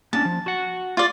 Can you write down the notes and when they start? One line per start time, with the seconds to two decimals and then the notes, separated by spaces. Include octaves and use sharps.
0.13 A#3 C#4 D4 A5
0.25 F3
0.46 F#4 F#5
0.97 F4 D5